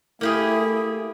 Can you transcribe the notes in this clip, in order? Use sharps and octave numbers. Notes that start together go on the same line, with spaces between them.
A3 A#3 E4 G4 G#4